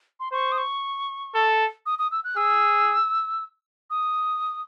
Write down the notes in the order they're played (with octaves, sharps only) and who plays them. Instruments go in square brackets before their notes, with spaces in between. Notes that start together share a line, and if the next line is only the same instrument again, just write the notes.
[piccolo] C6
[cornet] C5 [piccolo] C#6
[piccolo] D#6
C#6
[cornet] A4
[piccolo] D#6
D#6
E6
F#6
[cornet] G#4 [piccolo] E6
[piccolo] D#6